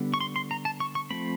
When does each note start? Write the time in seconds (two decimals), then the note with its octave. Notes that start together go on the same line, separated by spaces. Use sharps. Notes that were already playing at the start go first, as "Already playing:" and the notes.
Already playing: D3 G3 B3
0.14 C#6
0.21 C6
0.36 C6
0.51 A#5
0.65 A5
0.80 C#6
0.95 C#6
1.11 F3 A3 C4 B5